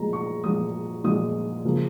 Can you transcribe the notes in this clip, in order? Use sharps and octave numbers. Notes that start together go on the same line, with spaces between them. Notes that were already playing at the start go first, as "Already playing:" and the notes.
Already playing: A#2 F3 G#3 A#5
C#6
A#2 F3 G#3 D#6
A#2 F3 G#3 D#6
C#3 F3 A#3